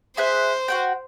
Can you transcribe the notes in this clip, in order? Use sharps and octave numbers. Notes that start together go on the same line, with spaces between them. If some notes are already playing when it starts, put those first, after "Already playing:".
G#4 C5 E5 F#6
F#4 F#5 G5